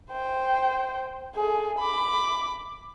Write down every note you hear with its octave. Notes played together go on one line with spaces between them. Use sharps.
C5 G5
G#4 A4
B5 D6